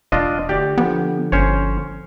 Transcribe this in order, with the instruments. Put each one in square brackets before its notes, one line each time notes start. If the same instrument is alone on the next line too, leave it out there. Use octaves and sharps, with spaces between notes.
[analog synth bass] E1 [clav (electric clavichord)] D4 F4 D#5
[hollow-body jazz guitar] D2 F#4 D5 [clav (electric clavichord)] G4
[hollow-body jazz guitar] D3 F3 [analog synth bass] B3
[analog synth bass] G1 [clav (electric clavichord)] C#4 C5 C#5